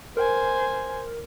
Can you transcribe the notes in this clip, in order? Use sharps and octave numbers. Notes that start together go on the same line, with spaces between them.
A#4 C5 G#5